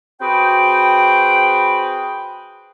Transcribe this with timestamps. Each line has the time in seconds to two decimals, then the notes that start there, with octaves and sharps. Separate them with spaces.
0.21 C4 F#4 G#4 B4 G5